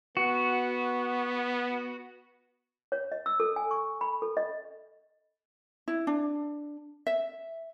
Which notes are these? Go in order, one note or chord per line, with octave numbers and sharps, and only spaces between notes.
B3 F#4
C#5
D#5
E6
A4
G#5
C#6
B5
A4
D#5
E4
D4
E5